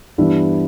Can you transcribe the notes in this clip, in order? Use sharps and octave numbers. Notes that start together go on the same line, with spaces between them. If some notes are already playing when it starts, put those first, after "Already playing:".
G2 E3 G3 B3 D4 E4 E5